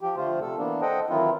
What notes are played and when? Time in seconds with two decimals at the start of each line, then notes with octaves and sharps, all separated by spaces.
0.01 F3 G4
0.16 D3 F3 A3 F4 C5
0.41 C3 A4
0.58 E3 A#3 B3 D4
0.82 A4 C5 D#5 F#5 G5
1.10 D#3 E3 F#3 C4 E4 F4